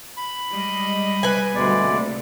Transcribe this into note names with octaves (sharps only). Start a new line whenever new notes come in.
B5
G3 G#3 D#5
B4 G#5
D2 B2 G3 G#3 D5
C3 A3 A#3